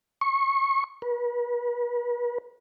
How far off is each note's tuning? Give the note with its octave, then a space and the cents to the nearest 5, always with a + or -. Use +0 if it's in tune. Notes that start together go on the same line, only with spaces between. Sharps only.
C#6 -25
B4 -40